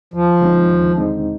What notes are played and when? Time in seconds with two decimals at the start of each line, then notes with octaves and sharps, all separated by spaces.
0.13 D#2 F3
0.41 D3 G#3 C4 D#4
0.69 D#2
0.97 D3 G#3 C4 D#4